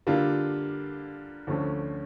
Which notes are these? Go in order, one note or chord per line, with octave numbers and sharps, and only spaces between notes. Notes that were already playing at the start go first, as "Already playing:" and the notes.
D3 G3 A#3 D4 F4
D2 D3 F3 A3 C#4